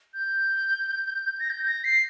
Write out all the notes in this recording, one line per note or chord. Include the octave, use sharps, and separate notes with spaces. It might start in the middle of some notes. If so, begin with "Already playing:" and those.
G6
A#6
G6
A#6
C7